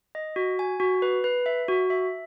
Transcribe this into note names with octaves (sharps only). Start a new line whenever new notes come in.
D#5
F#4
G#5
F#4
B4
B4
E5
F#4
E5